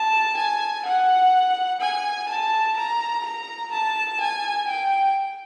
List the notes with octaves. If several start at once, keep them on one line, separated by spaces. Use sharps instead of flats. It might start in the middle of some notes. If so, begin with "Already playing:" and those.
Already playing: A5
G#5
F#5
G#5
A5
A#5
A#5
A5
G#5
G5